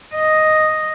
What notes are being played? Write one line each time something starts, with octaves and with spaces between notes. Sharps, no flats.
D#5